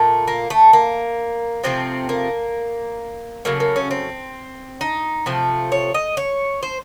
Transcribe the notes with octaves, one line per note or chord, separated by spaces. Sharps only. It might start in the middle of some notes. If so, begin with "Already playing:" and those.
Already playing: A#2 A3
A#3
A3
A#3
C3 F3 A3 C4
A#3
C#3 F#3 A3 A#3
A#3
C#4
C4
D#4
C3 F3 A3
C#5
D#5
C#5
C5